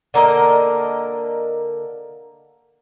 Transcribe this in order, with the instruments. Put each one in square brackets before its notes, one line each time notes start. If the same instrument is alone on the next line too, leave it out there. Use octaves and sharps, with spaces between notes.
[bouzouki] D3 A#3 A#4 D#5